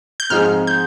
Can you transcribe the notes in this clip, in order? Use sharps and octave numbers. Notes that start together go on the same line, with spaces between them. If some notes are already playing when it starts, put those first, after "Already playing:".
G6
G#2 F3 C4 D#4 G#4 F6
G6